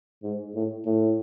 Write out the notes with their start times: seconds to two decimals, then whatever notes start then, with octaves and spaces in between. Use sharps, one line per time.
0.23 G#2
0.54 A2
0.86 A2